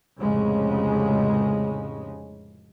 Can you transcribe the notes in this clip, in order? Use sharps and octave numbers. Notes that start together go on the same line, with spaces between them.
F1 A2 C#3 G#3